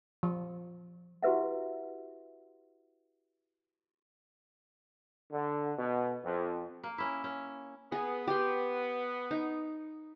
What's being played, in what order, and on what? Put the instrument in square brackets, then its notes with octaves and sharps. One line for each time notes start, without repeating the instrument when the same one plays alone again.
[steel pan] F3
[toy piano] E4 F#4 G4 B4 E5 F#5
[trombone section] D3
B2
F2
[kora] A#3
C#4 E4
C#4
[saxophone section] B3 [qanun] G#4
[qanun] G4 C6
D#4